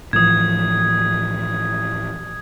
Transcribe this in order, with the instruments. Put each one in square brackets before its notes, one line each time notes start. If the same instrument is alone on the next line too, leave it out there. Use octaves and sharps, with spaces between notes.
[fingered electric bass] A2 E3 F3 [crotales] D#6 G#6